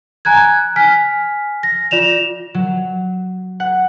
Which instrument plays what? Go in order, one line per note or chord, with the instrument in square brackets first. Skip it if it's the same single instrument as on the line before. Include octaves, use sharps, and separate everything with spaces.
[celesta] G#5 A#5 F#6 G#6
G#5 F6 B6
A#6
F4 D5 E7 F7
[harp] F#3
F#5